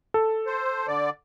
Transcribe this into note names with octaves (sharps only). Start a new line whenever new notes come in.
A4
C5
D3 D5